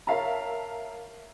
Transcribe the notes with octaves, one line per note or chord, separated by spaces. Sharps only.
A#4 C#5 E5 F5 A5 A#5